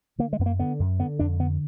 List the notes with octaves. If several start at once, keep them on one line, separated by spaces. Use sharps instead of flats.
D3 A#3
G#3
F#2 B3
A#3
D3 B3
F#2
D3 B3
F2 D4
D3 B3